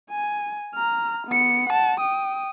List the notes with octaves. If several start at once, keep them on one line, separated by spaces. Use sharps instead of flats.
G#5
A#5 F6
B3 C#7
F#5 A5
G5 D#6